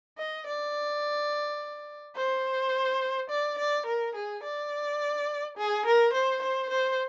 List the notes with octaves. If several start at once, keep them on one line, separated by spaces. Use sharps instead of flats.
D#5
D5
C5
D5
D5
A#4
G#4
D5
G#4
A#4
C5
C5
C5